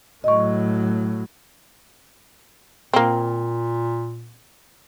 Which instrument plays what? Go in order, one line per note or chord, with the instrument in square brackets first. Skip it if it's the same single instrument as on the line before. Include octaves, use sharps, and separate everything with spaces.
[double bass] A2 F#3 [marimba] D#5 C#6
[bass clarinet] A#2 [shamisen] A#3 C4